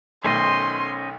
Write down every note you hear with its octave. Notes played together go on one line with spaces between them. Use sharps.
B1 D#3 A3 C#4 C5 D#5 C6